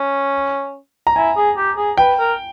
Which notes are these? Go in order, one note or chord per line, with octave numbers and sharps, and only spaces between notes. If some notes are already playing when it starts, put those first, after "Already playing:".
Already playing: C#4
A#5
E4 G#5
G#4
G4
G#4
B4 G5
A#4